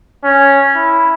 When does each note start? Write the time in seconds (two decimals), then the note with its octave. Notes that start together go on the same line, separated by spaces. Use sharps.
0.24 C#4
0.76 E4